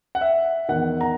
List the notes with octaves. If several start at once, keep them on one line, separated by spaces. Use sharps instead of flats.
F#5
E5
E2 D#3 F#5
A#5